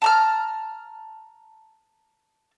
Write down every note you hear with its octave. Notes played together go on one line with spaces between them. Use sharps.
A5 A#5 F6